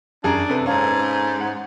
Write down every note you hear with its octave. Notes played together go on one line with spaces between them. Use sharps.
F#2 D4 G#4 A#5
C3 A4 B4
G#2 C#4 A4 F5
F#5